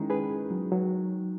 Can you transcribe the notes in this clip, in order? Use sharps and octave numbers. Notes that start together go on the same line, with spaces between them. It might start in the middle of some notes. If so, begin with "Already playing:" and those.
Already playing: D#3 G#3 C#4 E4
G#4 B4
F#3
F#3